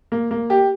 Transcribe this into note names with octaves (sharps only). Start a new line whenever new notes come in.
A#3
A#3
G4